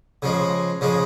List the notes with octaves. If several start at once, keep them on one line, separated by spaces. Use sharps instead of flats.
C#3 F3 G#3
C#3 F3 G#3